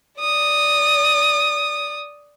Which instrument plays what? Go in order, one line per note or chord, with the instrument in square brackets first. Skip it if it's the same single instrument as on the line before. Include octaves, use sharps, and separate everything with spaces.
[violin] D5 D#6